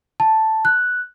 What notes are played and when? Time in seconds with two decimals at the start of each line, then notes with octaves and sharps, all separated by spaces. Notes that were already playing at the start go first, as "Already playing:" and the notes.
0.20 A5
0.65 F#6